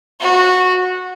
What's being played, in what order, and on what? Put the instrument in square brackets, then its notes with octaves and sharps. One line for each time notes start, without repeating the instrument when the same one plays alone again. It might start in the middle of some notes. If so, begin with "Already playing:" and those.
[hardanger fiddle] F#4